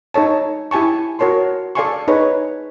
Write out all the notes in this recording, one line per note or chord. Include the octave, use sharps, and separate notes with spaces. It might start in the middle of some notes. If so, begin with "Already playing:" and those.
D#4 A4 C#5 A5
E4 G4 G#5 A5 C#6
F#4 A#4 C#5 A5 C6
A4 D5 F5 G#5 C6 C#6
D#4 G#4 B4 C#5